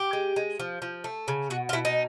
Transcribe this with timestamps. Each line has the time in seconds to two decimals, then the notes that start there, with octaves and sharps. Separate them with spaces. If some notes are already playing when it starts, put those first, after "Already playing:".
Already playing: G4
0.13 G#3
0.36 G#3
0.59 F3
0.82 F3
1.04 A3
1.28 C#3
1.50 B2 F#4
1.69 F4
1.73 B2 E4
1.85 D#4